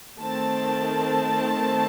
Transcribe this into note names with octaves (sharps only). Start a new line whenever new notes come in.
D#3 A3 C4 A5